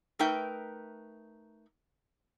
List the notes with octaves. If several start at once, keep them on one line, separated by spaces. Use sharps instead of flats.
A3 D#4 A#4 B4 E5 G5